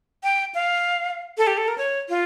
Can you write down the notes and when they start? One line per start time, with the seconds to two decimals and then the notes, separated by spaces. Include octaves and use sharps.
0.23 G5
0.55 F5
1.38 A4
1.47 G4
1.57 A4
1.68 A#4
1.78 C#5
2.09 F4